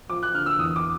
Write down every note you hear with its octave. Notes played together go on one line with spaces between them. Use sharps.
F3 D6
F#6
D3 F6
E6
E2 D#6
D6